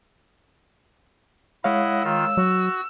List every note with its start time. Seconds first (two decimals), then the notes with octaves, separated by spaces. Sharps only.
1.64 G#3 E4 C#5 D#5 F5 F#5
2.04 D#3 F4 E6
2.37 F#3 F#4